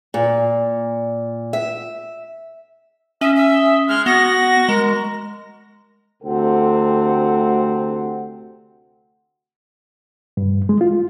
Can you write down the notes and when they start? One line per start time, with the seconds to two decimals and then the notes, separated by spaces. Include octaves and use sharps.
0.14 A#2
1.53 E5
3.21 C#4 D#5 E5
3.36 E5
3.88 G#3 F6
4.06 B3 F#4 A#6
4.69 G#3 A#4
6.22 D2 C3 C4 A4 F#5
10.37 G2
10.69 G#3
10.81 F4